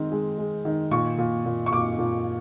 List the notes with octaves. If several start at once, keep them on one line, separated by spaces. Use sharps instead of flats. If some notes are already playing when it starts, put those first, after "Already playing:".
Already playing: D#3 G#3 C4
G#3
G#3
D#3
A#2 C#6
A#2
A#2
C#6
A#2 D6
A#2